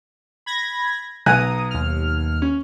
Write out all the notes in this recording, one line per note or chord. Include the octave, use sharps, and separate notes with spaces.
B5 G#6 A#6
B1 G#5 A#5 D#6 F#6
D#2 F6
C#4